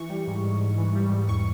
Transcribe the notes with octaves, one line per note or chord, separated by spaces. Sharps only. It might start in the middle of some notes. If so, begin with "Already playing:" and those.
Already playing: E3 C#6
G3
G#2
G#2
G#2
E3
G3
G#2
E2 C#6